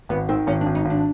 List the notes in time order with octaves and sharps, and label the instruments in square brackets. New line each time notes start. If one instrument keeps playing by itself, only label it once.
[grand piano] G#1 [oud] B3
[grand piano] D#3 [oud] C4
[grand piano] G#1 [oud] C#4
[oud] D4
[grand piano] G#1
[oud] D#4
[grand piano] G#1
[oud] D4